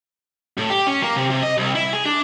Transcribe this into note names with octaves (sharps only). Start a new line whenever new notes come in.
A2
G4
C#4
A#3
C3
C3
D#5
C2
E4
G#4
D4